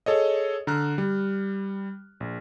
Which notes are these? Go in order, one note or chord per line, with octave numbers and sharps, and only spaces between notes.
G#4 A4 C#5 D#5
D3 A#5 F6 F#6
G3
A#1